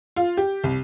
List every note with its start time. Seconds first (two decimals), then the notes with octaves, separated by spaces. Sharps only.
0.16 F4
0.37 G4
0.64 C2